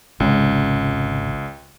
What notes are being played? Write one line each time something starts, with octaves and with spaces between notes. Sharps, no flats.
G#1 C#2 C3 C#4